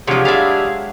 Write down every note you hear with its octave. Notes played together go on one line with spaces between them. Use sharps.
C3 F3 F#3 G#3 D4 F4 G4 G#4
E4 F4 D5 E5 F5